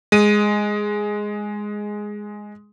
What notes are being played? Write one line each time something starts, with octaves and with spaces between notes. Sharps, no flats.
G#3 D#7